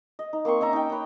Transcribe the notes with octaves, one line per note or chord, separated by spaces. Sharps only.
D#5
D#4
A#3 C4 C6 C#6
C#4 D#5 E5 A#5
D#4 G5
C#4 B4